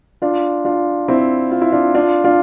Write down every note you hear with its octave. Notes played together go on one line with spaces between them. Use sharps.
D4 F4
D4 F4
C4 E4
F4
E4
D4 F4
D4 F4
D4 F4